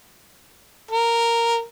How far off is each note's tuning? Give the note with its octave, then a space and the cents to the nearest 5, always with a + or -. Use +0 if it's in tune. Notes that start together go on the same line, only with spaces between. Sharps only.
A#4 -5